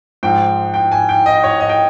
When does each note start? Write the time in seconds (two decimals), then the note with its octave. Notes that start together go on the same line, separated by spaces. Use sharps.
0.23 G#2 F3 G#3 G5
0.74 G5
0.92 G#5
1.09 G5
1.26 D#5
1.44 C#5
1.60 D#5
1.69 G5